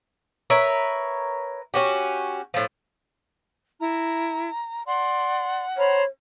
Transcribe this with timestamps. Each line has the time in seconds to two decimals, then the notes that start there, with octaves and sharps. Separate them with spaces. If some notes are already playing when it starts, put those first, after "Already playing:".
0.50 A#4 B4 C#5 E5
1.74 C#4 F#4 G4
2.54 A2 F3
3.81 E4 A#5
4.87 D5 F#5 C6
5.77 C5 C#5 A#5 B5